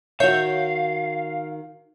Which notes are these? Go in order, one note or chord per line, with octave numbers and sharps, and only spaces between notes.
D#3 F#4 C#5 E5 F5 G6